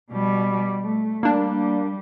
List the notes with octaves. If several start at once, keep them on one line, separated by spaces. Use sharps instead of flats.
B2 G3
A3
G3 A#3 D4